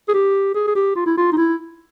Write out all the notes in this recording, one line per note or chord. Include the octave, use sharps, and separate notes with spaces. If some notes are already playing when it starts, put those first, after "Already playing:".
G#4
G4
G#4
G#4
G4
F4
E4
F4
D#4
E4